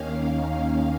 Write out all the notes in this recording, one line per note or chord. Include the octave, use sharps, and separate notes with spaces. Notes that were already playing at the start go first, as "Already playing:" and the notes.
Already playing: D#2 D#3 A#3 C#4 F5
F5